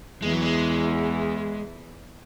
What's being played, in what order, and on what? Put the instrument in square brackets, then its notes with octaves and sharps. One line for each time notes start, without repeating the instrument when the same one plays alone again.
[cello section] E2 E3 [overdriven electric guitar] G#3
[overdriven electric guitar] F#3
G#3